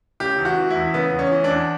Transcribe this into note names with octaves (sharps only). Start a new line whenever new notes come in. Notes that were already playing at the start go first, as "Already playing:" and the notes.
C#3 G4
E2
F#4
E3
E4
E2
C#3 B3
E2
C#4
E3
D4
E2